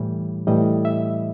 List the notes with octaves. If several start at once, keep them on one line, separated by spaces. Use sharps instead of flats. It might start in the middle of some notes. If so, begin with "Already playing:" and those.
Already playing: A2 E3 G3
A2 E3 G3 D#5
E5